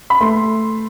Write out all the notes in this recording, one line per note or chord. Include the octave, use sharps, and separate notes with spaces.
B5
A3 C6